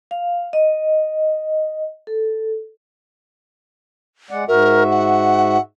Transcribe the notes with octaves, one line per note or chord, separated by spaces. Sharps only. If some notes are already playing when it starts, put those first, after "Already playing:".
F5
D#5
A4
G#3 D5 F#5
G#2 F#4 A#4 E5
F#5